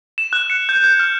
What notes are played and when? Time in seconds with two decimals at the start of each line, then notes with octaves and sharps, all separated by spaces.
0.18 E7
0.33 F#6
0.50 C#7
0.69 G6
0.84 G6
1.00 F6